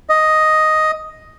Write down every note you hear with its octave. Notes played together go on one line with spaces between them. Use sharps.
D#5